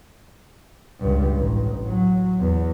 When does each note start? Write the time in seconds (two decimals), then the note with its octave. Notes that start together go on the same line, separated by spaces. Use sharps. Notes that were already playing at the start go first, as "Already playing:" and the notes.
0.99 C#2 G2
1.36 A1
1.87 F#3
2.40 E2